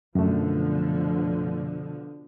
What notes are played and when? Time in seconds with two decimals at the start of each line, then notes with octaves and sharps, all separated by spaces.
0.15 F#2 B2 D3 F3 A3